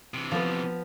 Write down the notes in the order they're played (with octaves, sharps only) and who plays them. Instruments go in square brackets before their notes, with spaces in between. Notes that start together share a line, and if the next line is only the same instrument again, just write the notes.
[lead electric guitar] C3 E3
[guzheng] F3 B3